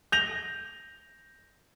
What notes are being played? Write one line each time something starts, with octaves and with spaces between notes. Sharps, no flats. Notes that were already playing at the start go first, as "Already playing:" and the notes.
G6 A#6 F7